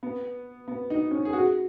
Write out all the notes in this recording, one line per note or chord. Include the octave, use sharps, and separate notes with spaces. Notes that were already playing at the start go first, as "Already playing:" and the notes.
B3
B3
D#4
C#4
G#4
F#4